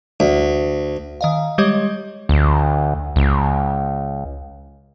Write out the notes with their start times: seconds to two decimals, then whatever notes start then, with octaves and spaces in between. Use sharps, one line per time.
0.20 D2
1.21 D#3 D#5 F5
1.58 G3 G#3 G4 C#5 D#5
2.29 D2
3.16 C#2